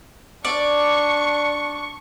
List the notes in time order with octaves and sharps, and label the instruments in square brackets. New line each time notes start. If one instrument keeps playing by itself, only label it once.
[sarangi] D4 [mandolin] D5 [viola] C#6